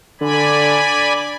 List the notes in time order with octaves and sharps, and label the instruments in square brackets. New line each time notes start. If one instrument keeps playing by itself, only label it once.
[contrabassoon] D3 [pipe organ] D5 G#5 B5